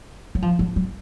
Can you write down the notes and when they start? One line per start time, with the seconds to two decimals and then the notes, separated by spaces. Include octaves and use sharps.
0.35 F#3
0.42 F3
0.59 F#3
0.76 F#3